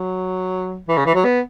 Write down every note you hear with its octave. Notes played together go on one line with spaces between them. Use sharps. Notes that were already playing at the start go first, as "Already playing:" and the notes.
Already playing: F#3
E3
C#3
E3
F#3
B3